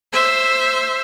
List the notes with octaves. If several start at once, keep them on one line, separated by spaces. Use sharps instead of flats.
C5 E5